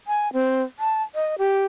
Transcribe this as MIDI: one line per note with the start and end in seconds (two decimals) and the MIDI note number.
0.07 0.31 80
0.33 0.62 60
0.79 1.02 81
1.15 1.35 75
1.38 1.66 67